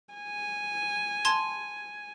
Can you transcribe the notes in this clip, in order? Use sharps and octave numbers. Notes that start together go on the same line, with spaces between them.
G#5
A5 C6 G#6